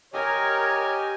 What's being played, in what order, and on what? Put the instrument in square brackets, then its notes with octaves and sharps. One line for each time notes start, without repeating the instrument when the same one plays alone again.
[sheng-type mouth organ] G4 D#5 G#5 [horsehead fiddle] A#4 [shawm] C#5